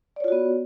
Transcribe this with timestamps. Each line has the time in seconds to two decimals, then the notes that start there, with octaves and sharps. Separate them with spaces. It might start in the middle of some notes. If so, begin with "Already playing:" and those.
0.16 D5
0.20 C#5
0.24 F4
0.28 F#4
0.32 B3